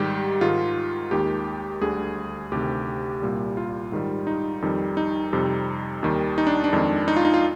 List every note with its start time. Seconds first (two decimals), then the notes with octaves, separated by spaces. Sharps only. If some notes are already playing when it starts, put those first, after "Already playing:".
Already playing: G#2 D#3 G3 G4
0.41 G#2 D#3 G#3 F4
1.11 D#2 D#3 G#3 G4
1.81 D2 D3 G3 G#4
2.52 D2 C3 D#3 G4
3.22 C2 A#2 G3
3.57 F4
3.92 G#2 D#3 G3
4.27 D#4
4.62 F2 D#3 G3
4.97 D#4
5.33 F2 C3 G3
6.03 D#2 D#3 G3
6.38 D#4
6.47 D4
6.64 D4
6.73 F2 D#3 G#3
7.08 D#4
7.16 F4
7.25 D#4
7.34 F4